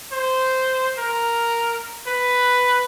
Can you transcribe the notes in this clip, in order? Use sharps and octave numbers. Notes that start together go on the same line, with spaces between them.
C5
A#4
B4